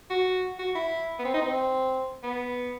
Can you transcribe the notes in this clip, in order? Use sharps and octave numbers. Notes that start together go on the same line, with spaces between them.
F#4
F#4
E4
B3
C4
D#4
C4
B3